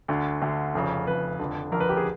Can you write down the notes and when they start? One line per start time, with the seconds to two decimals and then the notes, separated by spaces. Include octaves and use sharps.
0.08 D2 D3
0.42 D2 D3
0.75 F1 F2 C#3
1.07 F1 F2 C#3 B4
1.39 F1 F2 D3
1.72 F1 F2 D3 A#4
1.80 B4
1.89 G4
1.97 G#4